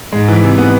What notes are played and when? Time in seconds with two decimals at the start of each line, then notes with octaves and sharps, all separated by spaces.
0.12 G#2 G#3
0.28 E3
0.43 C3
0.58 B3